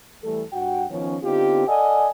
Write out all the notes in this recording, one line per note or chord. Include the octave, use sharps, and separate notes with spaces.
E3 G3 A3 A4
G2 F#4 F#5 G5
D#3 F3 B3 C#4
D3 B3 C4 D#4 F4 G4
A4 D5 D#5 F#5 G#5